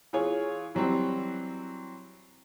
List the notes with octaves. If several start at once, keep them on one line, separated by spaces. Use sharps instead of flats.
E3 F4 G#4 C#5
E3 F#3 G3 C4 F#4